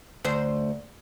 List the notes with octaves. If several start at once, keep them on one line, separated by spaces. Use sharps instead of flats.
D2 C5